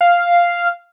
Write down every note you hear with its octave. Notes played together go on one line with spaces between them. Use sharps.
F5